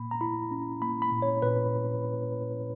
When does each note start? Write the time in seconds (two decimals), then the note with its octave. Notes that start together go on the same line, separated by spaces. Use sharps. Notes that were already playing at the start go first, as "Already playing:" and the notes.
Already playing: A#2 A#3 B5
0.11 A#5
0.21 E4 B5
0.51 C#4
0.82 A#3 B5
1.02 B5
1.12 A#2
1.22 C#5
1.42 A#2 B4